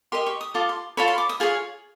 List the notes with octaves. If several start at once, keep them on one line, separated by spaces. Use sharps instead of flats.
G4 A#4 D#5 C6
C#6
D#6
F4 A4 D6
C6
F4 A4 C#5 B5
C6
D6
D#6
F4 G#4 C#5